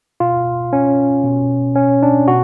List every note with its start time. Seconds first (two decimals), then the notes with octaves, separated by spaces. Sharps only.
0.20 B2 F4
0.73 C#4
1.24 B2
1.75 C#4
2.03 D4
2.28 B2 F#4